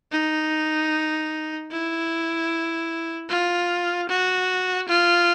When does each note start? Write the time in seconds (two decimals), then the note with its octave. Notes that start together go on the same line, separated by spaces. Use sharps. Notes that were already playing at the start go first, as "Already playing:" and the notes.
0.12 D#4
1.71 E4
3.29 F4
4.09 F#4
4.88 F4